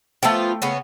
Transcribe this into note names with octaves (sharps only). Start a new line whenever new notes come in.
F3 A3 B3 F4 G5
C#3 B3 C#4